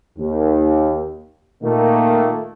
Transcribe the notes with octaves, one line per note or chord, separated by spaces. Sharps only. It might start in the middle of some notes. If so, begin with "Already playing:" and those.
D#2
A#2 D#3 A3 A#3